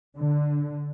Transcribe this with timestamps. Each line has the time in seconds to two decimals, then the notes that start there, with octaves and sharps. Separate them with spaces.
0.15 D3